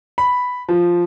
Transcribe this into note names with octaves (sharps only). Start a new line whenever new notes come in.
B5
F3